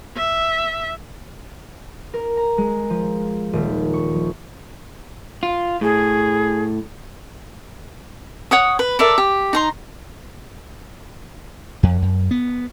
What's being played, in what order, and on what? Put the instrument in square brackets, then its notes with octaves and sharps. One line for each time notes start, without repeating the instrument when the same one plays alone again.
[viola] E5
[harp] A#4
A#5
G#3
F3
D#1
C#6
F3
[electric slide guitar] F4
[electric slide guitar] A2 [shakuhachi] G#4
[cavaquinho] C#5 F#5 D#6
B4
A4 A#4 D5 E5
G4
D#4 A#5 C6
[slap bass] F2
F#2
B3